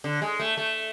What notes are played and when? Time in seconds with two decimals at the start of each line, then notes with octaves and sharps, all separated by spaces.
0.04 D3
0.22 G#3
0.39 A3
0.57 A3